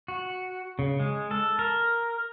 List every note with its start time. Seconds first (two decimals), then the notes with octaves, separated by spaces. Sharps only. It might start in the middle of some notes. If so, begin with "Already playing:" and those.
0.08 F#4
0.79 C#3
1.00 G#3
1.31 A4
1.59 A#4